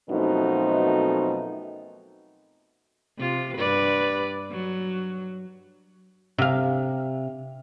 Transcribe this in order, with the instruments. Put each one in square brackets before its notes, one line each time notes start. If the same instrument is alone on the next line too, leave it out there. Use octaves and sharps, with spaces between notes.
[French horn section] F#2 B2 F3 A3 C4 D#4
[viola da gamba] C3 F4
G2 B4 D5
F#3
[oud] C3 F5